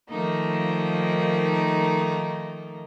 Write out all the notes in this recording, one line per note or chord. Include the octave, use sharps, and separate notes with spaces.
D#3 F3 A3 A#3 D#4